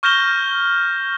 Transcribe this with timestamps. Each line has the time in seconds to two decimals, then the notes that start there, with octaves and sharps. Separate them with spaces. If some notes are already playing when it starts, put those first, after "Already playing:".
0.03 C#6 F6 G6 A#6 E7 G7